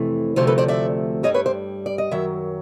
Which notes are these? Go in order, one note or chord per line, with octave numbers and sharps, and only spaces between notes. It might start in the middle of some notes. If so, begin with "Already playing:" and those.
Already playing: F2 C3 E3 A3
D2 C3 F3 A3 C5
A4 B4
C5 D5
D5 E5
G2 E3 G3 C#5 D#5
B4 C#5
C5 D5
D5
D#5
F#2 D#3 F#3 E5